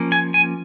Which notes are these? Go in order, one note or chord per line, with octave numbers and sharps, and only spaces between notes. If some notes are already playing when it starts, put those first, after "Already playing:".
Already playing: F3 A#3 C#4
G#5
G#5